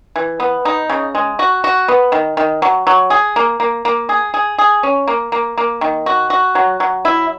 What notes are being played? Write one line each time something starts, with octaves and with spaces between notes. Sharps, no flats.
E3
B3
D#4
C#3
G#3
F#4
F#4
B3
D#3
D#3
F#3
F#3
G#4
A#3
A#3
A#3
G#4
G#4
G#4
C#4
A#3
A#3
A#3
D#3
F#4
F#4
F#3
F#3
E4